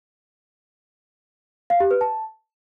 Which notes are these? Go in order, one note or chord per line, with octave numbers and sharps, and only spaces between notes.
F5
G4
B4
A5